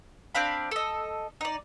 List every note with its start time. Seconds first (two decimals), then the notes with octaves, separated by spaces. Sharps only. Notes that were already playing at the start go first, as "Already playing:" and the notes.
0.35 C4 D4 F5 B5
0.71 A4 D#5
1.41 D#4 D5